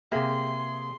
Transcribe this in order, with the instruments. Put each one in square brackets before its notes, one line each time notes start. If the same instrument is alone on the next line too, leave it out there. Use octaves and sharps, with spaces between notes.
[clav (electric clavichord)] C3 A#3 [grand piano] G4 G#4 [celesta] E5 [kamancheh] C6